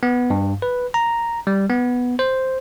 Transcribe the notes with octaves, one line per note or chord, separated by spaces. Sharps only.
B3
G2
B4
A#5
G3
B3
C5